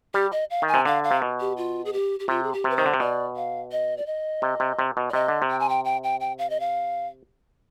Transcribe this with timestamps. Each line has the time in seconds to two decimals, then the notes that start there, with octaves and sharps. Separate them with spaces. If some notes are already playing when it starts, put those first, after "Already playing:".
0.14 G3 G4
0.32 D#5
0.50 F5
0.62 D#3
0.68 G#5
0.74 C3
0.85 D3 F5
1.04 F5
1.11 C3
1.22 B2
1.40 G4
1.57 F4
1.85 G#4
1.93 G4
2.20 G4
2.28 C3 F4
2.43 G#4
2.53 G4
2.64 C3
2.70 B4
2.77 D#3 C5
2.86 D3
2.94 C3
3.00 B2 D5
3.36 F5
3.72 D#5
3.97 D5
4.06 D#5
4.42 C3
4.60 C3
4.79 C3
4.97 B2
5.10 D5
5.13 C3 D#5
5.28 D3
5.42 C3
5.50 G5
5.60 G#5
5.69 G5
5.85 G5
6.04 G5
6.20 G5
6.38 F5
6.50 D#5
6.60 F5